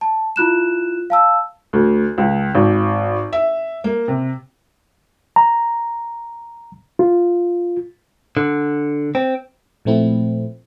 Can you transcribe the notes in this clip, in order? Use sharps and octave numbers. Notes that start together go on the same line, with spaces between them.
A5
E4 F4 F#6 E7
F5 A5 E6
D2
C#2
G#1
E5
A#3
C3
A#5
F4
D3
C4
A#2 F3 A3 C4 E4